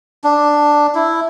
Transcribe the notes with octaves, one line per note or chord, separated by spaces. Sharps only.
D4
E4